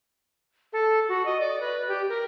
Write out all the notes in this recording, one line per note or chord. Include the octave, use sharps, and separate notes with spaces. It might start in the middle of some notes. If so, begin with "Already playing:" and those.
A4
F#4
D#5
D5
B4
G4
A#4